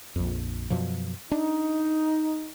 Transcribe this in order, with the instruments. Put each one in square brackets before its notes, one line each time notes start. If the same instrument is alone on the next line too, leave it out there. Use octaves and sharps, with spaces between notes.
[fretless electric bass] A#1 F2
F#2 B2 F3
[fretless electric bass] D4 [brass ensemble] D#4